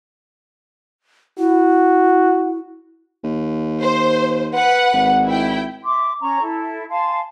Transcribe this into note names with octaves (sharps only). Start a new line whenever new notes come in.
E4 F#4
D#2
C5
B4 F#5
G#1
E4 G5
E5 C6 D6
C#4 C#5 A#5 C#6
E4 A4
F5 G#5 A5 C6